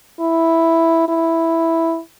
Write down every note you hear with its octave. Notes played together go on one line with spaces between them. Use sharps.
E4
E4